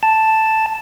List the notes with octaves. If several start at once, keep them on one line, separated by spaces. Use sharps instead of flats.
A5